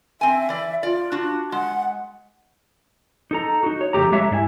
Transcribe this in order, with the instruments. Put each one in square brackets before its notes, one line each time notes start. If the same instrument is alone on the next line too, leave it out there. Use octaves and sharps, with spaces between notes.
[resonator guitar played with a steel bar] C4 G#5 [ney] E5
[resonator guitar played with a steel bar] E3 D5
[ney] F4 [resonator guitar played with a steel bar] D5
[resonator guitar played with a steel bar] D4 F#4
[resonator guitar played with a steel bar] G#3 [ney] F#5
[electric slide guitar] D#4 A4 A#5
D#4 F#4
C#5
F2 C#3 A3 G4 A#5
G#3 A3 G4 C#5 E5 A#5
G#2 D4 E4 G#5